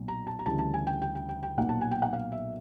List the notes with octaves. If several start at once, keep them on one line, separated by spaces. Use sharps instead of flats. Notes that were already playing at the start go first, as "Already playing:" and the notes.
Already playing: B1 A#2 F#3
A#5
A5
A#5
D2 C#3 E3 G3 A5
A5
G#5
G5
G5
G5
G5
G5
B1 A#2 F#3 A#3 F#5
A5
G#5
G5
F#5
F5
E5